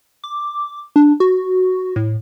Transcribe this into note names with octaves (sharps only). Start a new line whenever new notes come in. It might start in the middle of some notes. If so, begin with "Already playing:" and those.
D6
D4
F#4
A2